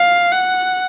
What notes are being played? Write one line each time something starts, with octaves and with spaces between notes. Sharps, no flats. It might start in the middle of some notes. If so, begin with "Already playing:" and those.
Already playing: F5
F#5